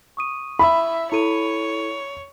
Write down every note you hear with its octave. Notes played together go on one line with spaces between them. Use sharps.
C#6 D#6 D#7
E4 E5 B5
E4 A4 C#5 D#7